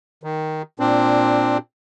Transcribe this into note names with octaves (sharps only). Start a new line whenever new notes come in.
D#3
A#2 C4 D4